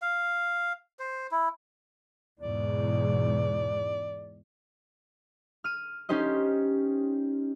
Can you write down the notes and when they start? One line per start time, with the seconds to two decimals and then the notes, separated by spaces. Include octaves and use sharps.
0.02 F5
0.99 C5
1.32 E4
2.40 E2 G#2 B2 D5
5.64 F6 D#7
6.09 C#4 D#4 G4 C5 D#5